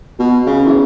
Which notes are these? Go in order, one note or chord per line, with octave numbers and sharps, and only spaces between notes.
B2
C#3
E3